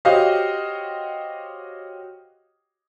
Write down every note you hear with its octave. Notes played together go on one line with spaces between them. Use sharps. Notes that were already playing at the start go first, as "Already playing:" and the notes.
F#4 G4 C5 C#5 D#5 F5